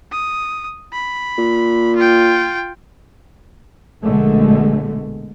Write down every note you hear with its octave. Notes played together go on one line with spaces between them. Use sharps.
D#6
B5
A#2
F4 G5
A#1 B2 D3 G#3 A3